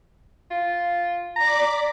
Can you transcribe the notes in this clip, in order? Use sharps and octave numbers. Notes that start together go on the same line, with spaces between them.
F4
D5 A#5 D6 B6